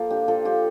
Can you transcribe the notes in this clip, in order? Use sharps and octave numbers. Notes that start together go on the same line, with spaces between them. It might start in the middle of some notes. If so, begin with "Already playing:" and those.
Already playing: F3 A#3 A4
D4 G4
F3 A4
F3 G4